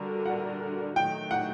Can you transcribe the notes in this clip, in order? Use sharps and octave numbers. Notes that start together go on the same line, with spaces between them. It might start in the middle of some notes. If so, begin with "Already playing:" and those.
Already playing: D3 G3 D4 F#4 A#4
F#5
D#3 F#3 A3 D#4 F#4 G5
F#5